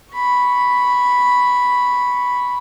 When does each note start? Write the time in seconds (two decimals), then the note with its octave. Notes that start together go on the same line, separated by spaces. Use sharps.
0.13 B5 C#6